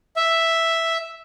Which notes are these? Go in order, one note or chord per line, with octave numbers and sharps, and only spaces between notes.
E5